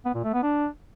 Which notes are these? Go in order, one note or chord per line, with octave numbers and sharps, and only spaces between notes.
B3
A#2
A3
B3
D4